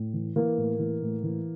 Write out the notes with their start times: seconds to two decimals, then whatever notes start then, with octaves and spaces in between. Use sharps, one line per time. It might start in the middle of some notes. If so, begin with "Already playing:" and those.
Already playing: A2
0.14 E3
0.36 E3 A#3
0.58 A2
0.79 E3
1.02 A2
1.23 E3